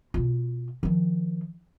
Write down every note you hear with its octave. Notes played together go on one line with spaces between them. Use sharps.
B2 F4
D#3 F3